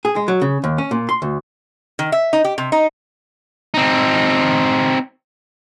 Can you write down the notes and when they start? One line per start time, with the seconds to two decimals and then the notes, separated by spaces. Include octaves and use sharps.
0.05 G#4
0.16 G#3
0.28 F#3
0.41 C#3
0.64 D#2
0.78 C#4
0.91 A#2
1.09 C6
1.22 D2
1.99 D#3
2.12 E5
2.33 D#4
2.44 G4
2.58 C3
2.72 D#4
3.74 C4 D#4